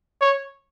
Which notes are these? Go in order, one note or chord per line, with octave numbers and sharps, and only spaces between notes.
C#5